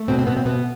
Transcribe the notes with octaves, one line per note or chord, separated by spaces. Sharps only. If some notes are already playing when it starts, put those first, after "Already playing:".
Already playing: A3
B2 C4
C4
B2 B3
C4
B2 B3